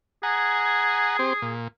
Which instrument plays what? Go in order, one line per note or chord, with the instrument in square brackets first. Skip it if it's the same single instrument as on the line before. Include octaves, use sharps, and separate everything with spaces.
[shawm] G#4 [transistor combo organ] F#5 G#5 A#5
[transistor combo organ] C4 G4 C5
A#2